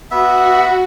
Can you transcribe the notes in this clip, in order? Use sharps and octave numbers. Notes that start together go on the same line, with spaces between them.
B3 F#4 E5